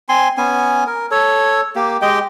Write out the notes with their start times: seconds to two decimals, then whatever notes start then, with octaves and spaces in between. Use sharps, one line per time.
0.09 C4 G#5 C6
0.37 B3 C#4 G#5
0.87 A#4
1.11 A4 C#5
1.76 A#3 G4
2.02 G#3 G4 D#5 G5